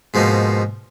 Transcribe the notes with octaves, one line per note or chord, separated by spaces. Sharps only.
G#2 B2 F3 A#3 D#4